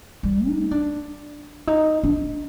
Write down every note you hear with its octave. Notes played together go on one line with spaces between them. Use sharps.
G3
D#4
D4
D#4
D4